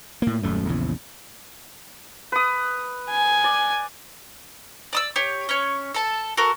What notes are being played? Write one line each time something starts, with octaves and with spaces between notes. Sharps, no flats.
A2 A#3
D#1 F#2 A3
A#1 E2 C#3
B4 D#6
G#5
D5
D5 D#6 E6
G4 C#5
C#4 C#5
A4 A5
F#4 A4 A#4